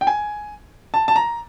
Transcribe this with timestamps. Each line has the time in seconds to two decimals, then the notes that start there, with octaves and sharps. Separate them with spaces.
0.01 G5
0.07 G#5
0.94 A5
1.08 A5
1.16 A#5